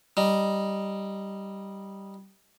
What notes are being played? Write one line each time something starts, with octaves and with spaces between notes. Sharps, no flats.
G3 D#4